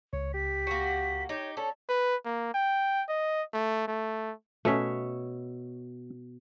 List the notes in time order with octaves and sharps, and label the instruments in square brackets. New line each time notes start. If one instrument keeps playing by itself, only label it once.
[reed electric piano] C#2 [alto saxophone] C#5
[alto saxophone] G4 [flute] B6
[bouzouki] A#3 F#4
[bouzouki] D#4 G4 [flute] C#5
[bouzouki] C#4 A4 [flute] D5
[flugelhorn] B4
A#3
G5
D#5
A3
A3
[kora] B2 C#5 E5 [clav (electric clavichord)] A3 C#4